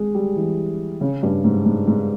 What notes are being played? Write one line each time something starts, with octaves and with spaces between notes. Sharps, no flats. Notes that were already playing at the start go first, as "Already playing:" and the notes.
Already playing: G#3
G3
E3
C#3
G2
G#2
G#2
G#2